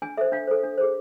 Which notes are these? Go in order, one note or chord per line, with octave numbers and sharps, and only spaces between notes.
D4 G#5
A4 C5 E5
D4 F5
A4 C5
D4
G#4 C5